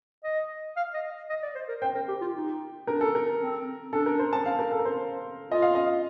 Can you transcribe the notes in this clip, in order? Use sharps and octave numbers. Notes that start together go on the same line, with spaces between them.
D#5
F5
D#5
D#5
D5
C5
A#4
C5 G5
A#4
G4
F4
D#4
D4 A#4
A4
A#4
C4
D4 A4
A#4
C5
A5
F5
A#4
A4
A#4
C5
F4 D#5
F5
D#5